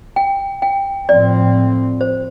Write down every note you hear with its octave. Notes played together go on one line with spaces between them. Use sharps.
G5
G5
A2 F3 C4 D5
C5